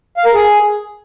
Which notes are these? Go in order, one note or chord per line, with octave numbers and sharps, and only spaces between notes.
F5
A#4
G#4